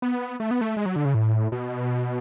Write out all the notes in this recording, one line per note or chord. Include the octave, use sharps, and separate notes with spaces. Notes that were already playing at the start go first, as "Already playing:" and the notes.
B3
A3
B3
A3
G#3
F#3
D3
C#3
A2
B2